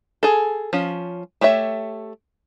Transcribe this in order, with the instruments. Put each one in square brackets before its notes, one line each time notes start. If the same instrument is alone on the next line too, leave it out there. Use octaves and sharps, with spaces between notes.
[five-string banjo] G#4 A4
F3 C#4
A3 G4 C#5 E5